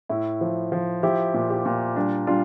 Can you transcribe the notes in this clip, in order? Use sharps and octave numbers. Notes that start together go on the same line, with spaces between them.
A2 E4
F3
F3
F3 E4 G4
A#2
E4 G4
A#2
G3 D4
G3 D4 F4